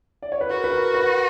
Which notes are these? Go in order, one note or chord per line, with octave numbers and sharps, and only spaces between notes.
D5
C#5
B4
F#4 A#4
B4
A#4
B4